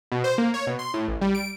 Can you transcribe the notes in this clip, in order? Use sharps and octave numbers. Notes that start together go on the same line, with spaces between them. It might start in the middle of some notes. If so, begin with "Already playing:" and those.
B2
C5
A#3
C#5
B2
C6
A2
A1
G3
D7